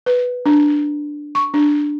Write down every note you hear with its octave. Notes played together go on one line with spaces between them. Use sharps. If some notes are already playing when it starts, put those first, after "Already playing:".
B4
D4
C#6
D4